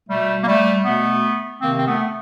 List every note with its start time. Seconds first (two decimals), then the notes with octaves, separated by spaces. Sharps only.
0.09 B2 G3 A3
0.43 A#3
0.47 G3 A3
0.85 B2 A3 B3
1.61 C3 D#3 A#3 C4
1.79 C4
1.87 A3 B3